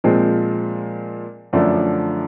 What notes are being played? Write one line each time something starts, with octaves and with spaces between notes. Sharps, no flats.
A#2 F3 G#3 C4
F#2 D3 F3 A3 D4